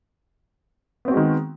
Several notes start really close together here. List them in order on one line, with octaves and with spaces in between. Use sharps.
B3 C4 F#4 G#3 D#3